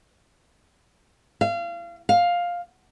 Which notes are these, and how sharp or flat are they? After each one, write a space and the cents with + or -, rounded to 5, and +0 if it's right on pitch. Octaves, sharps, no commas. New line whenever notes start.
F5 -30
F5 +10